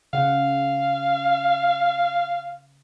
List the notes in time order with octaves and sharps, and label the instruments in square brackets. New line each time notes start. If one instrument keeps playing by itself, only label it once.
[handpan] C#3 F#5 [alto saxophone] F5